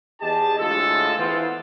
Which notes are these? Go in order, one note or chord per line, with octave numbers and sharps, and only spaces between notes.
E2 G4 G#4 D#5 A5
D2 A2 G#3 F4 A4
E3 B3 C4 F4